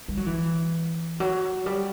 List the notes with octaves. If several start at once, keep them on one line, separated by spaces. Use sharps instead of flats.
G3
F#3
E3
F#3
G3